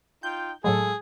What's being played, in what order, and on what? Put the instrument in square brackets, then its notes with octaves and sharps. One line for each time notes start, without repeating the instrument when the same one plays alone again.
[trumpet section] D#4 F4 G5 [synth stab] G6
[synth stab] A2 F#3 G#3 [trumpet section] F4 A4 [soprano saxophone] G#4